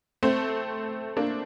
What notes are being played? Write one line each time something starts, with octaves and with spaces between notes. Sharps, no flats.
A3 C4
A#3 D4